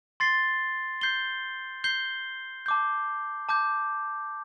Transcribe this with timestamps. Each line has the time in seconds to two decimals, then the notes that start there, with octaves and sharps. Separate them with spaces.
0.20 C6 A6 C7 G7
1.01 G6 C7 G7
1.84 G6 C7 G7
2.66 A5 D6 G6
3.49 A5 D6 G6